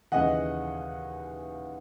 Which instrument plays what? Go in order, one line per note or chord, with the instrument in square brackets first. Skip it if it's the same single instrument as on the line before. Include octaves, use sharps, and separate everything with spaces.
[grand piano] D#2 C#3 E3 D#5 F#5